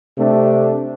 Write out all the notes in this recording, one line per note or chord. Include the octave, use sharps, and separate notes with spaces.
C3 A3 D4